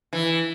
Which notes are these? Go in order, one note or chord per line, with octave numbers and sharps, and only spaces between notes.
E3